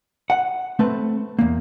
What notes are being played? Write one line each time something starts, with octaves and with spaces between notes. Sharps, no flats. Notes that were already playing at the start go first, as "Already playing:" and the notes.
F#5
A3 C4 B4
E2 A#3